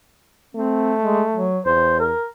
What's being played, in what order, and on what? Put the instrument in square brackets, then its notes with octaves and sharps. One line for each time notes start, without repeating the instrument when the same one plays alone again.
[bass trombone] A3 [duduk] C4
[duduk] G#3
F#3
[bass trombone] E2 [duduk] C5
[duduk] A#4